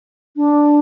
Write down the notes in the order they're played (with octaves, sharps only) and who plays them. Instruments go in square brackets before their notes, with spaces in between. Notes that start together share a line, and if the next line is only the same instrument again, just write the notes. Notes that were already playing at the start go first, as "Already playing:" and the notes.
[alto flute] D4